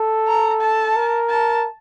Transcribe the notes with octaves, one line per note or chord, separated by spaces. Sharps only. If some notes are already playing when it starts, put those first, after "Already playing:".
Already playing: A4
A#5
A5
A#4
A5